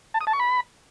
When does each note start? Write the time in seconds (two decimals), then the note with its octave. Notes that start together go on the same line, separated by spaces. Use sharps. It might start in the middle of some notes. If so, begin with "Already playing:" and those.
0.14 A5
0.21 D#6
0.27 A5
0.33 C#6
0.40 B5